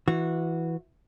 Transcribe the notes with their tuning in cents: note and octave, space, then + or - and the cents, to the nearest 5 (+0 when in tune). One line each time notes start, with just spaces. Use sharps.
E3 +0 F#4 -15